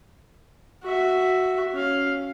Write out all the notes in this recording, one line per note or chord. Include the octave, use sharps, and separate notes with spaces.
F#4 E5
C#4 F5